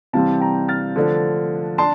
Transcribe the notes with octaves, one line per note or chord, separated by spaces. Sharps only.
C3 E3 G3 C4 F5 A5
G5 A#5
F6 A6
D3 F3 A3 D4
D4 A5 C6